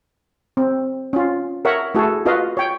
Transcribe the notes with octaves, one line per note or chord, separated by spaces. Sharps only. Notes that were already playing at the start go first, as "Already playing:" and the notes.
C4
C#4 F4
A#4 C#5 E5 F#5
A3 E4 F#4 G#4 A4
F4 F#4 B4 D#5 F5
C#5 G5